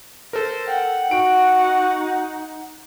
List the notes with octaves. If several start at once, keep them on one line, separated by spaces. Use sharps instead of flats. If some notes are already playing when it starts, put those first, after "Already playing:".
A4 A#4 C5
F#5 G5
D#4 F#4 D7